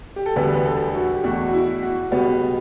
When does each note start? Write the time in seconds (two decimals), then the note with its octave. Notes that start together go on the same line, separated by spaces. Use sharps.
0.16 G4
0.26 A4
0.36 E1 D2 D3 G3 B3 B4
0.54 B4
0.65 A4
0.95 F#4
1.14 G4
1.24 E2 B2 A3 F#4
1.49 F#4
1.53 E4
1.83 F#4
2.11 C#2 B2 G3 B3